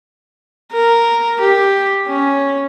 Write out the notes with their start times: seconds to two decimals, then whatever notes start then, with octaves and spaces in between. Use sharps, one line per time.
0.72 A#4
1.40 G4
2.08 C#4